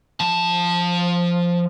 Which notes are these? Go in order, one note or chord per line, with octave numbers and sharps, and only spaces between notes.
F3 A5